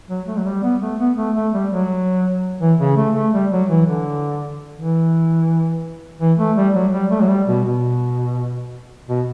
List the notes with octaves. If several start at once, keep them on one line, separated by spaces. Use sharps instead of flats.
F#3
A3
F#3
G3
B3
A3
B3
A3
A3
G3
F#3
E3
C#3
A3
A3
G3
F#3
E3
D3
E3
E3
A3
G3
F#3
G3
A3
F#3
G3
B2
B2
B2